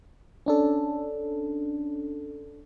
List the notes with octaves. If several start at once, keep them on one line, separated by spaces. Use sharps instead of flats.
C#4 D4 A4